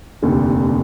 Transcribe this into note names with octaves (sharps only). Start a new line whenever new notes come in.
F1 D#2 D3